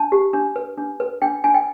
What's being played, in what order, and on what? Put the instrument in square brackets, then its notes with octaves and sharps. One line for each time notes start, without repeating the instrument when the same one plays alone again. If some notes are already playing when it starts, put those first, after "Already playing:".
Already playing: [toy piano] D4 A5
G4
D4
B4
D4
B4
D4 G5
D4 G#5
G5